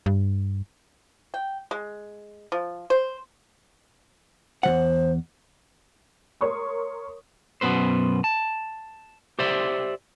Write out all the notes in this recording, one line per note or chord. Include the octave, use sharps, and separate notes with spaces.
G2
G5
G#3
F3
C5
E2 F3 C5 F#5
A#4 C#5 C6 C#6 D#6
F#2 B2 D3 B3 B4 C5
A5
G4 C5 D5 E5